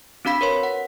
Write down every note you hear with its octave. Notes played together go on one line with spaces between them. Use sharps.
C4 D4 F#4 F5 B5 B6
A#4 B4 C#5 C6
F#5